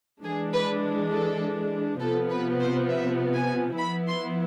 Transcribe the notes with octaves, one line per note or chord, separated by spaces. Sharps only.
E3 G#3 D4 G#4
B4
A4
C3 F3 B3 A4
B4
C5
E5
G#5
F3 B3 E4 B5
C6